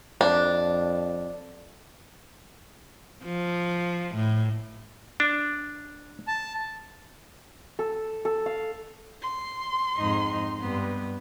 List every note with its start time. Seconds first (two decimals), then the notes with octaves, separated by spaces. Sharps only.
0.21 F2 D4
3.23 F3
4.15 A2
5.20 D4
6.27 A5
7.79 A4
8.25 A4
8.46 F5
9.22 C6
9.97 F2 G#2 D#4
10.60 G2 B3